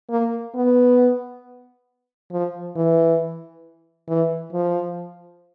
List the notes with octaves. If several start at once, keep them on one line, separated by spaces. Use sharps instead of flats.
A#3
B3
F3
E3
E3
F3